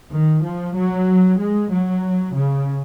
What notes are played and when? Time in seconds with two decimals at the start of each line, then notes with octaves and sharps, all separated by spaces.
0.11 D#3
0.43 F3
0.74 F#3
1.38 G#3
1.70 F#3
2.34 C#3